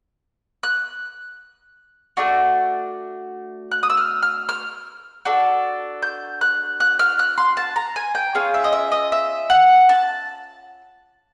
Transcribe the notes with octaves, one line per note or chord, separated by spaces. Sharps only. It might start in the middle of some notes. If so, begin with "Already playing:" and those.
F#6
A3 D4 F#4
F#6
D#6
E6
F6
F6
F6
D4 F#4 A4
G6
F#6
F#6
F6
F#6
C6
A5
A#5
G#5
G5
C#4 F4 G#4 F5
E5
D#5
E5
D#5
E5
F#5
A5